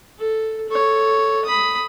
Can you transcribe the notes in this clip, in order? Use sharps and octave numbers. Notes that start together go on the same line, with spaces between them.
A4
A4 C#5
B5 D#6